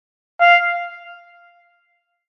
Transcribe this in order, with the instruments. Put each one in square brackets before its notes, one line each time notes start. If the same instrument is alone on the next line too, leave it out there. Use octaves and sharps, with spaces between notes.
[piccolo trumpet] F5